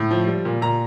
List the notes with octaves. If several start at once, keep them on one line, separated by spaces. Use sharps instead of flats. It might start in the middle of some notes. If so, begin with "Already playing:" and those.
Already playing: A2
F3
G3
A#2
A#2 A#5